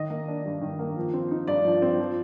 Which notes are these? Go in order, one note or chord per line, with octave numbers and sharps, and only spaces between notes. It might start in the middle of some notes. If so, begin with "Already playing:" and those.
Already playing: D#3 D#5
A#3
D4
G2
D#3
A#3
F3
C4
D#4
G2 D5
F3
C4
F3